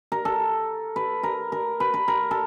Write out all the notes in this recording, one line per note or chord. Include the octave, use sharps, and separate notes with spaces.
A#4
A4
B4
A#4
A#4
B4
B4
A#4
A4